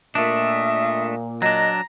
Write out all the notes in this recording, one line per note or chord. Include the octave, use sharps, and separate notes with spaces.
A#2 A3 D4 D#5 E5
F#3 D4 D#5 A#5